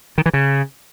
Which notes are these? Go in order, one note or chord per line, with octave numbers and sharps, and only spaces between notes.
D#3
E3
C#3